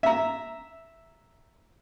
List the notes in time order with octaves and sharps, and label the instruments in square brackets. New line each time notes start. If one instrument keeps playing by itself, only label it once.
[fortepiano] E5 A#5